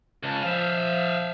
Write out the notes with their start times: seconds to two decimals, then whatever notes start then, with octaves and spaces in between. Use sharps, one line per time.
0.24 C#2 C#4 A5
0.43 F3 E5 F5